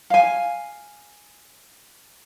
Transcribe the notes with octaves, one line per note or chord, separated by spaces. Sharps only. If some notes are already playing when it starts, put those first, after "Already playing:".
F5 G#5